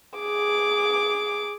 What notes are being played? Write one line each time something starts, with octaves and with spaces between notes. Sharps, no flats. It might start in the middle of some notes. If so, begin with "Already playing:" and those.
G#4 D6